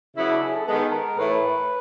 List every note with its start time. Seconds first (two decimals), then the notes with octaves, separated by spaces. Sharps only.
0.17 C#3 F#3 B3 E4
0.30 D4
0.42 G#4
0.55 A4
0.68 D#3 G#3 B3 A4
0.93 A#4
1.18 A2 E3 A3 B4